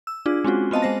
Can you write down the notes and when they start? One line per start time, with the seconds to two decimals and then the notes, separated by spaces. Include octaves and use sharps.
0.07 E6
0.26 D4 F4 G#4
0.44 G#3 C4 C#4 F4 F#4
0.71 B3 C4 D#5 F5 A5
0.82 G#3 C5 A#6